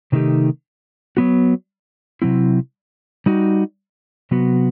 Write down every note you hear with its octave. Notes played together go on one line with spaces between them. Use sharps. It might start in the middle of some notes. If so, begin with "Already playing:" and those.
C3 D#3 A3 D#4 G4
F#3 B3 F#4
C3 F#3 C4 E4
G3 D#4 F#4
C3 F#3 B3 F#4